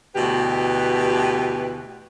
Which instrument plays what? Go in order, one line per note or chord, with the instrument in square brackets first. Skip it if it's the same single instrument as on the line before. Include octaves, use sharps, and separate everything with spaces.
[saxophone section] D2 B2 E3 G4 B4